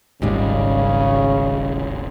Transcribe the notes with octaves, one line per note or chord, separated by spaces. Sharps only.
D#1 G#1 D#2 G#2 C#3 G3